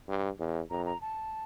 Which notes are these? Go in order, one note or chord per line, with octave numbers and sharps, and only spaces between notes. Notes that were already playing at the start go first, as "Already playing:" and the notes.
G2
E2
F2 A#5
A#5
A5